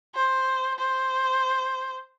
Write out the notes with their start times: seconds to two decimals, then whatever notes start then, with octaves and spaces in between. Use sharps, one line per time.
0.15 C5
0.78 C5